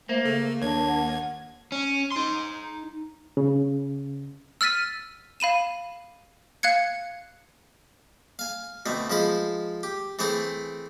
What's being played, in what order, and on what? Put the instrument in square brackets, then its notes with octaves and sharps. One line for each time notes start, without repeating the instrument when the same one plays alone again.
[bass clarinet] A3 [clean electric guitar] A#3 [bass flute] C5
[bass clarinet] C#3 [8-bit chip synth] A3 [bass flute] A4
[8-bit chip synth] D#2 G#6 [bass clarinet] D4 [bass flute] C#5
[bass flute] F#5
[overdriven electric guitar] C#4
D#4 C6
[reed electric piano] C#3
[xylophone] E6 F6 A6 B6 D#7
F5 B5 D#7 E7
F5 F#6 G#6 C#7
[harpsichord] F5 G#5
D2 B2 A3 C4
F3 G#3 B4 C5
G4
E3 A3 C4 G#4 C5